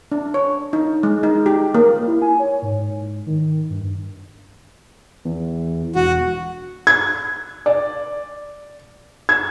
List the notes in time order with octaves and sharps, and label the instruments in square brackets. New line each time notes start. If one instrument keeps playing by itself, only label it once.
[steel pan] D4
C#5
D#4
G#3
D#4
G4
A#3
[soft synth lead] E4
G#5
C#5
G#2
D#3
G2
[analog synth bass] E2
[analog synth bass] E1 [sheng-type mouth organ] F#4
[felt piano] G#6
D5
G#6